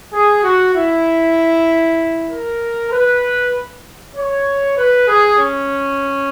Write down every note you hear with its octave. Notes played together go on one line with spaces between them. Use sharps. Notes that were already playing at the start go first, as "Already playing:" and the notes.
G#4
F#4
E4
A#4
B4
C#5
B4
G#4
C#4